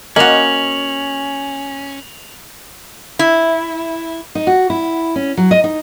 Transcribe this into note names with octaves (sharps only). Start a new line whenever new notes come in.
A#3 C#4 F#4 D#5 F7 F#7
E4
D#4
F#4
E4
C#4
F#3
D#5
D#4